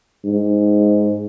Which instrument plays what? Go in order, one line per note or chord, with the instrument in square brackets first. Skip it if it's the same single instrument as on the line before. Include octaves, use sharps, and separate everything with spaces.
[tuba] G#2